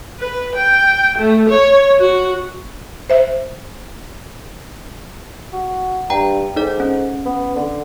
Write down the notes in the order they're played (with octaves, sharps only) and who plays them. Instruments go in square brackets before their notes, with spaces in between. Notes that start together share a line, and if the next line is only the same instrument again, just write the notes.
[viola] B4
G5
A3
C#5
F#4
[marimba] C5 E5
[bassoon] F#4
[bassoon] G2 [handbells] G5 A#5
[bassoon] G#2 [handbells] D#4 A4 D5
[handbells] C#4
[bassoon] B3
D3